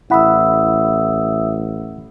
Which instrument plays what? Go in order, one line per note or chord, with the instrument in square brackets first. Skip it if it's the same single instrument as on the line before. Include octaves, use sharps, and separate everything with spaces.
[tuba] A1 [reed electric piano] E4 F#5 B5 [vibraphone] E5 D#6 E6